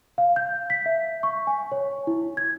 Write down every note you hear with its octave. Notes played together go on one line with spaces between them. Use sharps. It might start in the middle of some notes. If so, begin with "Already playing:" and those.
F5
G6
B6
E5
C#6
G#5
C#5
E4
G#6